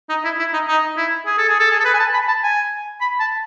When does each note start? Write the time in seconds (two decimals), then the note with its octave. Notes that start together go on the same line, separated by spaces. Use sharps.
0.09 D#4
0.25 E4
0.39 E4
0.53 D#4
0.68 D#4
0.97 E4
1.26 G#4
1.38 A4
1.49 G#4
1.60 A4
1.71 G#4
1.80 A4
1.85 B4
1.94 G#5
2.00 A5
2.14 B5
2.28 A5
2.43 G#5
3.01 B5
3.20 A5